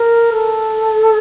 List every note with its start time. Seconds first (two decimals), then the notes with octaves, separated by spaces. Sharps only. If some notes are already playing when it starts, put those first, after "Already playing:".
Already playing: A#4
0.32 A4